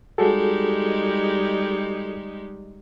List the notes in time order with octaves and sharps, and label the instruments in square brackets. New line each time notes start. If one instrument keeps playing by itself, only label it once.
[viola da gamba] G3 G#3 D#4 [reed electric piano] F#4 G#4 A4